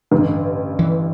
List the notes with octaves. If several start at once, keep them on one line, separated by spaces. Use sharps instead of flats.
A1 G2 D3
E3